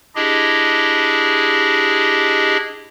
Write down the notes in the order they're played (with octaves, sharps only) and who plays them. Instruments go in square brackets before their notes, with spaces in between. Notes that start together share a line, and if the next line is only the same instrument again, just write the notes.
[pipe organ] D4 E4 G4 G#4 D#5